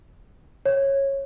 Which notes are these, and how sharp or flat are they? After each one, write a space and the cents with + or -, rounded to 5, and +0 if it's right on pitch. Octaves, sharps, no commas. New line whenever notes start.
C#5 -15